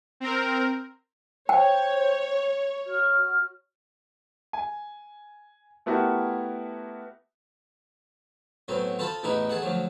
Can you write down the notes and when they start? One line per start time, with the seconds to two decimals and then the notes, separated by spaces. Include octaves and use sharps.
0.20 C4 A#4
1.49 C5 C#5 G5
2.87 F#4 F6
4.53 G#5
5.86 A3 B3 E4 F#4 G4 A#4
8.68 A2 F#3 B3 C4
8.99 F4 A4 C5 A5 B5 D#6
9.23 A1 E2 D#4 E4 B4
9.49 G#4 A4 F#5
9.62 D2 F3 F#3